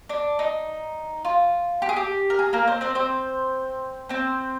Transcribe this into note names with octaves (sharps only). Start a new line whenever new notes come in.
D4
D#4
F4
G4
G#4
G4
A#4
G#4
A#3 A#4
C4 C5
C4 C5
C4 C5
C4 C5